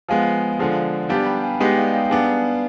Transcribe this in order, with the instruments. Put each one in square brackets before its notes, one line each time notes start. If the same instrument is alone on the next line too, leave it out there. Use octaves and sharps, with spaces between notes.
[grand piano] F3 G#3 B3 [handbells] F5 G#5
[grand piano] D3 F3 G#3
[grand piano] G3 B3 D4 G4 [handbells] F5 G#5
[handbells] G5 B5
F5 G#5
[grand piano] G#3 B3 D#4 G4 [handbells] D#5 G5
[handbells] D5 F5
G5
F5 G#5
[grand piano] G3 B3 D4 G#4 [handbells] F5 G#5